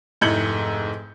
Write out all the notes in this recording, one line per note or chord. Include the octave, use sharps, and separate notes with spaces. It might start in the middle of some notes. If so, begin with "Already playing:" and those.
F1 G#2 E4 G6 C#7 F#7